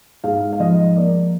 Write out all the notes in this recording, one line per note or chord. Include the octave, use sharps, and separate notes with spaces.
G#2 F5
F5
F3 D#5
A#3 D5